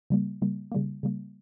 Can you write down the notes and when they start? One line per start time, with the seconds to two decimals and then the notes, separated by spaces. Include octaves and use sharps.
0.10 C#3 G3 A#3
0.42 C#3 G3 A#3
0.72 C#3 G3 A#3
1.03 C#3 G3 A#3